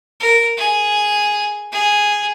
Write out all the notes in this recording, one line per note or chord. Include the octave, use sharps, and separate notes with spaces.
A#4
G#4
G#4